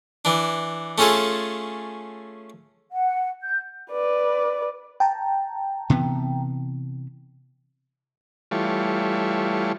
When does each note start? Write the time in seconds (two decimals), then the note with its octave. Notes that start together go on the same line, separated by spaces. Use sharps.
0.25 E3 D4
0.98 A3 C#4 F4 G#4 A4
2.92 F#5
3.43 G6
3.91 B4 D5
5.00 G5 A5 A#5
5.90 C3 E3 B3
8.51 E3 G3 A3 F4 C#5